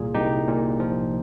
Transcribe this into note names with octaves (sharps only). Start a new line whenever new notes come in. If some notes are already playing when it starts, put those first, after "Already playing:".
Already playing: C2 A#2 F4 G#4
C2 D#4 G4
A#2
F3